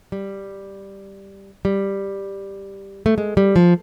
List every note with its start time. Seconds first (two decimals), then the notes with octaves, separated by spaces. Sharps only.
0.12 G3
1.65 G3
3.06 A3
3.18 G#3
3.37 G3
3.56 F3